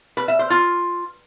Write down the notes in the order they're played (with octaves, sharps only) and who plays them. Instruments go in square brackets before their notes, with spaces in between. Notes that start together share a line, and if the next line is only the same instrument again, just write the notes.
[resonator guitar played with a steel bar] B4
E5
C5
F4